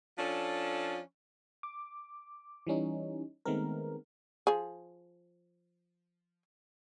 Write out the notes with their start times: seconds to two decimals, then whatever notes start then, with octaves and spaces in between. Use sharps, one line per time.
0.18 F3 C#4 D4 A4
1.63 D6
2.67 E3 G3 C#4 D#4
3.45 D#3 G#3 A3 B3 C4 A#4
4.47 F3 G#4